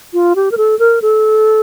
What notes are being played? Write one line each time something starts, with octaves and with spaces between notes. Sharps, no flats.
F4
G4
A#4
A4
A#4
A4